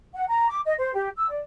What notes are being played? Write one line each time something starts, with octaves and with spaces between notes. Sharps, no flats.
F#5
A#5
D6
D#5
C5
G4
E6
D5